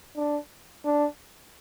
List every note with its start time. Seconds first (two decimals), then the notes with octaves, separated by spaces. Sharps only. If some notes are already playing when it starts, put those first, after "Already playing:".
0.16 D4
0.85 D4